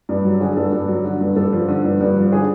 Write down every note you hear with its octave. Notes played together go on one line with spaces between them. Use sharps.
G2
F#3
D3 G#4
G2 A4
G2
F#3
D3
G2
G2 A4
F3
D3
G2
G2
F3
D3 G#4